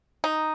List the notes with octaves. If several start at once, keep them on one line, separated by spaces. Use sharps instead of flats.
D#4